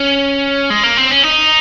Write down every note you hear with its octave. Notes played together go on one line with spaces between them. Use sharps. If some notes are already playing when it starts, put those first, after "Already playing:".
Already playing: C#4
G#3
A#3
C4
C#4
D#4